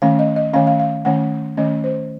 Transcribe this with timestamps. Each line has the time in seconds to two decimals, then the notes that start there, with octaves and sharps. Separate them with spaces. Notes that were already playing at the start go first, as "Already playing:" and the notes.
0.02 D#3 A3 C#4 F5
0.19 D#5
0.36 D#5
0.53 D#3 A3 C#4 F5
0.67 F5
0.80 F5
1.05 D#3 A3 C#4 F#5
1.57 D#3 A3 C#4 D#5
1.84 C5